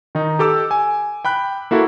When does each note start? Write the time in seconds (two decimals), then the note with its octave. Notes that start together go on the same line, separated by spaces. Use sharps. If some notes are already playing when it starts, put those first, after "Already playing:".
0.15 D#3 D#4
0.39 G4 A4 D6 E6
0.71 G#5
1.25 G5 B5 F#6
1.71 A#3 E4 F#4 A4